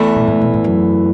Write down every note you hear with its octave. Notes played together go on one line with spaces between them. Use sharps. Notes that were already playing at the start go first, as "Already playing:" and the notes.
Already playing: E2 E3 A3
B2
A2
B2
A2
F#2